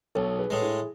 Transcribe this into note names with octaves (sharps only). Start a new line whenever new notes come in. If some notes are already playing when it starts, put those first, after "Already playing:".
B1 A4 C#5
G#4 B4
A2 G#3
E4 G#4